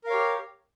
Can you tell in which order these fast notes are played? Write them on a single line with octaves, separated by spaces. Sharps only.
A#4 F5 C#5 G4